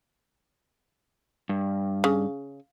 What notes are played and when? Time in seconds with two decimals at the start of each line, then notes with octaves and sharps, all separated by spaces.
1.49 G2
2.04 C#3